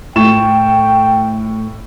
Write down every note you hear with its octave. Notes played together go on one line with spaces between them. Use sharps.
A2 G5 C#6 E7